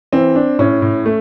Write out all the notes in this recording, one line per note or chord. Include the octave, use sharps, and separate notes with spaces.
E3 C4
D4
A2 C#4
A2
A3